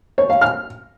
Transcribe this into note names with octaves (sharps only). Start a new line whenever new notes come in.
C#5
F5
F6